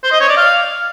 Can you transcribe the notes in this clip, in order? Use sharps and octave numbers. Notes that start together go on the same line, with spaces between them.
C5
D#5
C#5
D5
F5